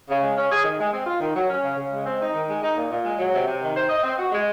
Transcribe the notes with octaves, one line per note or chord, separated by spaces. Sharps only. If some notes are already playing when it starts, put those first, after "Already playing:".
C#3
G#3
C#4
G#4
D#3
G#3
C4
F4
D#3
F#3
C#4
C#3
C#3
G#3
C4
D#4
D#3
G#3
D#4
A#2
A#2
G#3
F#3
C3
C3
D#3
C5
D#5
C4
F#4
G#3